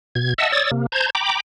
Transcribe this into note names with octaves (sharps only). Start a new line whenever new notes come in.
B2 G#6
D#5 E5 F#5 A5 E6
C#5 D5 D#6 E6 A6
C3 A#3
C5 A5 A#5 G6 G#6
G5 A#5 B5 D6